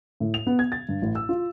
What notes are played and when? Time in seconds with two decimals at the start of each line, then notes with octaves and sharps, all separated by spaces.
0.20 A2
0.34 F7
0.47 B3
0.59 G#6
0.72 A6
0.89 G2
1.02 A1
1.15 E6
1.29 F4